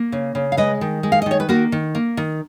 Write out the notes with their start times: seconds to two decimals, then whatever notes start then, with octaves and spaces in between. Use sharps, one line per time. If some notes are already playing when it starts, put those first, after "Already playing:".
Already playing: A#3
0.12 C#3
0.35 C#3
0.52 F5
0.57 G#3 B4 D#5
0.81 D#3
1.03 G#3
1.12 F5
1.22 D#5
1.26 D#3 C#5
1.40 B4
1.49 A#3 F#4 A#4
1.72 D#3
1.95 A#3
2.17 D#3